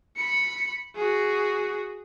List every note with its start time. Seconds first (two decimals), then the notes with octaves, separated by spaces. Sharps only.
0.17 B5 C#7
0.95 F#4 G#4